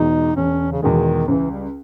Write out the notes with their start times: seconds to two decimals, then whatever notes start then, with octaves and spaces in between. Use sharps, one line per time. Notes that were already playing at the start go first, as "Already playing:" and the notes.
Already playing: E2 B2 G#3 D#4
0.36 E1 C#4
0.72 C#3
0.82 E2 B2 D#3 G#3
1.28 C#2 E3
1.51 G3